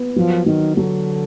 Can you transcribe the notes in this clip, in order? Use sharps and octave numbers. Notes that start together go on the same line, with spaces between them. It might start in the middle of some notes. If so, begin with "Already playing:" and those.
Already playing: B3
F3 F#3
D#3 F#3
D3 F#3